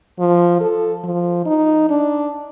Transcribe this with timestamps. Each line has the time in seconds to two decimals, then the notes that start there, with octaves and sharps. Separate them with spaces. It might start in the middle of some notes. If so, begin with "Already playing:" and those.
0.19 F3
0.60 A4
1.04 F3
1.46 D#4
1.90 D4